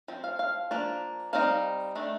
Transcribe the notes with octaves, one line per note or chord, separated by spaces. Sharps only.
F3 C4
F5
F5
F3 A#3 D4
G3 C4 D#4 F5
D#3 A3 D4